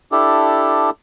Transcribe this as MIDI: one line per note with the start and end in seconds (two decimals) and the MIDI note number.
0.12 0.90 62
0.12 0.90 64
0.12 0.90 67
0.12 0.90 69